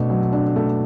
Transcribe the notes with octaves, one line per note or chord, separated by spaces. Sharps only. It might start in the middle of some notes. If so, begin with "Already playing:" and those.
Already playing: B2 A3 D4
F#3
D4
A3